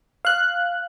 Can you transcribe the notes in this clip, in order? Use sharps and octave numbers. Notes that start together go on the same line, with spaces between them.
F5 F#6